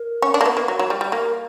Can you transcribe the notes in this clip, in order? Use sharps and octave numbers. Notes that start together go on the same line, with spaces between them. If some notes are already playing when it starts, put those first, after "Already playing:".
Already playing: A#4
C#4
D4
A#3
B3
A#3
F#3
F#3
G3
G3
A#3 A#4